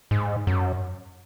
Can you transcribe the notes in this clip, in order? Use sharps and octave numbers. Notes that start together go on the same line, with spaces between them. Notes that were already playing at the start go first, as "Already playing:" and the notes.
G#2
F#2